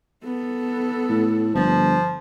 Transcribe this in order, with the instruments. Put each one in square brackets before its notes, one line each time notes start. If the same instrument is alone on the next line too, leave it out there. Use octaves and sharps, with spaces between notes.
[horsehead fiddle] B3 A4
[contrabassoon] A2
[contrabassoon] G1 [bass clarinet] F3